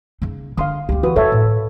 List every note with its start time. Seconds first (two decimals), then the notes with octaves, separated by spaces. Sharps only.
0.22 C#3 D#4
0.57 D3 D4 F5 C6 D#6
0.89 C#2 A3 G4
1.03 E3 F#4 B4 D#6
1.16 E2 F4 A4 C#5 E5
1.32 A2